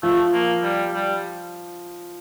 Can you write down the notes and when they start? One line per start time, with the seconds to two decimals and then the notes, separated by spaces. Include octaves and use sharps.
0.03 F3 A3
0.33 A#3
0.63 G3
0.94 G3